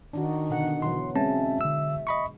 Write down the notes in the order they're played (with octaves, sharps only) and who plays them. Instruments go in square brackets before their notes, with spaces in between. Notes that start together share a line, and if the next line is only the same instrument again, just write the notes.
[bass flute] D#3 [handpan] D4 D#4 F#4
[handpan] B2 D3 F#5
[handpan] B2 E3 F#3 [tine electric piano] C6
[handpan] G#3 [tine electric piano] C4 C#4 A5 [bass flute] E5
[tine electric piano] D3 E6
D#5 B5 C#6